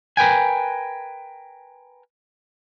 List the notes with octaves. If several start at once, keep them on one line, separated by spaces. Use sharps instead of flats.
A#4 B4 G5 G#5